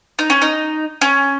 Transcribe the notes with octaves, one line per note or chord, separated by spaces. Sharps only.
D#4
C#4
D#4
C#4